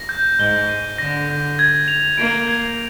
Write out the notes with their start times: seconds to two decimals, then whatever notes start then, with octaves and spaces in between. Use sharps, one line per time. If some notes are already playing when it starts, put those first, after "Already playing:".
Already playing: A#6
0.09 G6
0.39 G#2 G7
0.69 D#7
0.98 D3 A#6
1.29 G6
1.59 G#6
1.88 F7
2.18 A#3 D7
2.48 G#6